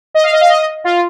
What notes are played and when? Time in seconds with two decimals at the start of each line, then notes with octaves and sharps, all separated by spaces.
0.14 D#5
0.24 F5
0.33 D#5
0.41 F5
0.49 D#5
0.84 F4